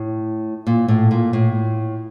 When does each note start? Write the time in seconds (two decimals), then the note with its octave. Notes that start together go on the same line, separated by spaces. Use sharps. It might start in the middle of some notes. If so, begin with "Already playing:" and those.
Already playing: A2
0.67 A#2
0.88 A2
1.11 A#2
1.33 A2